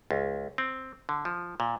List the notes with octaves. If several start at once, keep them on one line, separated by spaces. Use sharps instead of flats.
C#2
C4
D3
F3
A#2